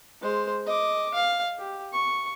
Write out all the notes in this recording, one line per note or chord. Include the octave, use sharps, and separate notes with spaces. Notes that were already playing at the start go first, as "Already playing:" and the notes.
G#3 C5
D#5 D6
F5
G4
C#6